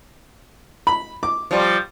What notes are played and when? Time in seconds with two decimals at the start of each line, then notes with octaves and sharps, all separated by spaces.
0.87 B5
1.23 D6
1.51 F3 G3